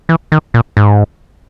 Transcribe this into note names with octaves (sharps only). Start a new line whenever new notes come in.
E3
D#3
A#2
G#2